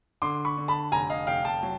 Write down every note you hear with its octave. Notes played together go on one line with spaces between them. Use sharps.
D3 C6 D6
B5 C#6
D3
A5 B5
F1 G#5 A#5
D#5 F5
F1 F5 G5
G5 A5
F#3